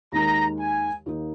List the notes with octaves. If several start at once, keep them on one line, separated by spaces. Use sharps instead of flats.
D#2 D#3 G#3 D#4 A#4 A#5
G#5
D#2 D#3 A#3 D#4